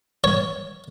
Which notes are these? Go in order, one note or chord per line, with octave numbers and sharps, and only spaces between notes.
C#5